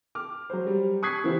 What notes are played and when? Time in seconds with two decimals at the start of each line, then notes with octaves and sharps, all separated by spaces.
0.15 D6 F6
0.50 F#3 C5
0.67 G3
1.03 C#6 D#6 F#6 G#6 B6 C7
1.24 C#3 E3 B3 E4 G4 C5